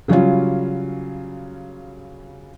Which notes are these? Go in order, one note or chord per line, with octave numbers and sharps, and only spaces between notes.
C#3 F#3 G3 C#4 F4